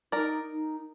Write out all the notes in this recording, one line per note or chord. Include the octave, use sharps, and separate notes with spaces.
D#4 A#4 D5
D#4